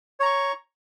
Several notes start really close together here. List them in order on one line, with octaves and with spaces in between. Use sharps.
C#5 A#5 C#6